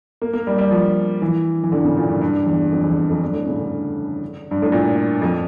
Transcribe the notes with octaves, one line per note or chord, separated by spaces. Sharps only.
A#3
A#3
G3
G3
F3
E3
E3
D3
C#3
A#2
G2
G2
E2
F2
E2
F2
G2
A2
C#3
D3
G2
A2
A#2
F2